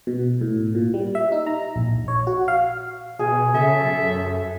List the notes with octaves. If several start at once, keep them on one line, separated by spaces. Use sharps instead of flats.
B2
A2
A#2
G3
E5
D#4
A#5
A#1
C#5
F#4
F5
B2 G#4
C#3 A4 E5
F#2 A4